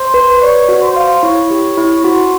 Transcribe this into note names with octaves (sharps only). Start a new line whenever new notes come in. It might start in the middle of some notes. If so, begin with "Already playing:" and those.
Already playing: C5
B4
C#5 D5
F#4
C5
F5
E4 C#5
G4
E4
F#4 C5